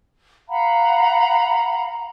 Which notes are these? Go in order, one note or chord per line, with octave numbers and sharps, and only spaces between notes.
F5 F#5 A#5 B5